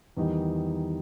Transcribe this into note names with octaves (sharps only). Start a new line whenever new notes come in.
E2 D#3 G3 D#4